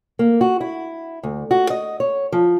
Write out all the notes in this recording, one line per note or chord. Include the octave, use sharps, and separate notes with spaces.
A#3
F#4
E4
D2
F#4
D#5
C#5
F3